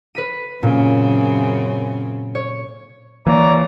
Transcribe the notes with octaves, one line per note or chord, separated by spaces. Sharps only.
B4 B6 D#7
F#2 A#2 C#3 C4
C#5
E3 A#3 C#5 D5 A#5